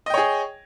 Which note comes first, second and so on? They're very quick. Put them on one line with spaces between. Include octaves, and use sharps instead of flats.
D#5 G5 C#5 G#4